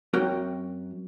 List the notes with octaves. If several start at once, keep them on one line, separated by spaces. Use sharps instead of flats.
F#2 C4 F#4 A#4 G5